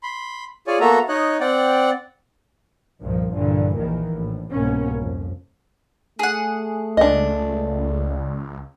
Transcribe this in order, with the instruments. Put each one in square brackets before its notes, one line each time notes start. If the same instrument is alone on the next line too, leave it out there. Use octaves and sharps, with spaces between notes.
[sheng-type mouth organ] B5 C6
F4 G#4 C#5 D5 G#5
A#3 B3 F#4 A4 E5 A#5
D#4 C#5 D#5 F#6
C4 D5 F#5 G5
[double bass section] C2 G2 A#2 D#3 F3
A#1 G2 A#2 D3 E3
A#1 D#2 D#3 E3
A#1 A2
C2 G#2 B2 A#3 C#4
F2
[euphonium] A3 [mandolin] G#4 F#5
[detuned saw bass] C#2 [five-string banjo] D4 D#5